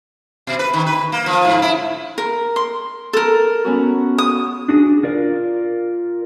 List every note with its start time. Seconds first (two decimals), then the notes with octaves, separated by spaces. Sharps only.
0.47 B2
0.59 B4
0.73 D#3
0.86 B4
1.12 A#3
1.26 F3
1.45 G#2
1.62 E4
2.18 A#4
2.56 C6
3.13 A4 A#4
3.64 B3 C#4 F#4
4.18 D#6
4.68 D4 F#4 G#4
5.03 F4 A#4 D5